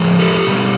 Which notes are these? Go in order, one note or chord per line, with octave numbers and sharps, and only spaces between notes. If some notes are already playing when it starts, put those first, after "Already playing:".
Already playing: A2 F3 G#3
G4 A4
B2 G3